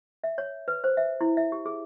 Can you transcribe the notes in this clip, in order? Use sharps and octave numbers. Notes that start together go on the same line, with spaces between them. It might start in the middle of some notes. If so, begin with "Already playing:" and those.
E5
C#5
B4
C5
E5
E4
E5
G4
G#4